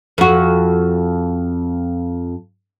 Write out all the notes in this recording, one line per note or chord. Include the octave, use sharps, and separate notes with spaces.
F2 F#4